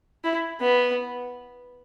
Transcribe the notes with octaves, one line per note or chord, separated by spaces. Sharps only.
E4
B3